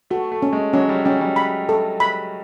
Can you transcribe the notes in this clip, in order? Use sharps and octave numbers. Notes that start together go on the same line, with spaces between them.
A3 F#4
A3
C#4
G#3
F#3 C#4
G3
G3 C#4
G3
B5
A4
B5